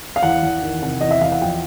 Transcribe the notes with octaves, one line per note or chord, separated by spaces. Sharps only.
F5
E2 F#5
E2
D#3
C3 F#5
E2 D#5
E5
E2 F5
F#5
F3 G5